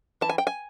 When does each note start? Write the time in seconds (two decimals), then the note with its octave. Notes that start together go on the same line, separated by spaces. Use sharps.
0.21 E3 A5
0.29 G#5
0.38 G5
0.47 G#5